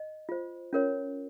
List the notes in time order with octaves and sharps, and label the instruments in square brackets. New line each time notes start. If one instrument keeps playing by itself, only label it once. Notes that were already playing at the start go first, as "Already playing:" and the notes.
Already playing: [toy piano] D#5
F4 C5
C#4 F4 A#4 C#5